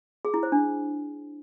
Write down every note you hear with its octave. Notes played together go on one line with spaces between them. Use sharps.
G#4
E4
C5
D4